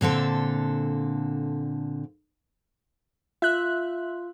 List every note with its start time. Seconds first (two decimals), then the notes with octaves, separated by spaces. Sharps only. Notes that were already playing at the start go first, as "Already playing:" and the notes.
0.01 A#2 D3 C4 A4
3.42 F4 E5 F#6